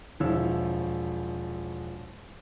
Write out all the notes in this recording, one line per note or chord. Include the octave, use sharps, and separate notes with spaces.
E1 F3 E4 C#5 E6